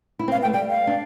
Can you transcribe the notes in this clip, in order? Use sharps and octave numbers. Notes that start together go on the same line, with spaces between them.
E4
C4
F5
B3
G5
A3
G3 G5
F5
D4